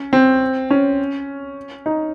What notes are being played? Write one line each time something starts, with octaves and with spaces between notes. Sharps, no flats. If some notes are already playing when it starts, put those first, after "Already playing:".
Already playing: C#4
C4
C#4
D#4